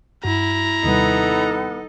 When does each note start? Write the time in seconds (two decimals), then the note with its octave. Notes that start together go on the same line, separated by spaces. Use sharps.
0.24 G2 E4 F#4 A#5
0.84 D#2 C3 G3 B3 D#4 A4